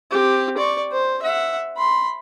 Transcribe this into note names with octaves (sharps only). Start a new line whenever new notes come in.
C4 G4
D5 C#6
C5
E5 F#5
B5 C6